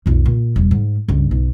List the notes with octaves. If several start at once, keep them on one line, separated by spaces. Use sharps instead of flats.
B1 F2
A#2
E1 G3
G#2
C#2 G2
B1